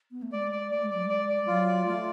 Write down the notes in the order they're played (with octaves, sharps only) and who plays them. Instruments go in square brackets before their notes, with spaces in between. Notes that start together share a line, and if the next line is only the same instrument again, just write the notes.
[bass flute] B3
A3
[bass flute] G#3 [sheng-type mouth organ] D5
[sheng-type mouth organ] D5
[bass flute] A3 [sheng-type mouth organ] D5
[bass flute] G#3
[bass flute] F#3 [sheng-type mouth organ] D5
[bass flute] G#3
[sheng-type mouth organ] D5
D5
[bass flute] G#3
[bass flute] F#3 [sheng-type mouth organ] F4
[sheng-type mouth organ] D5
[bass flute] A3 [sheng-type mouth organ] F4